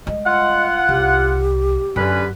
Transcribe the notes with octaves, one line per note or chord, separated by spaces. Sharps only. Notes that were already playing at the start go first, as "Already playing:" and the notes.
G3 G#3 D#5
F4 F#5
C2 G4
F#2 D3 C#4 B4